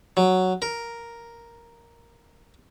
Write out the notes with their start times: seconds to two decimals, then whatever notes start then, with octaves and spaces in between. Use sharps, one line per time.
0.17 F#3
0.62 A#4